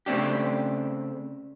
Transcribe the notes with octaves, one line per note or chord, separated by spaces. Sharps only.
C#3 A3 C4 D4 G4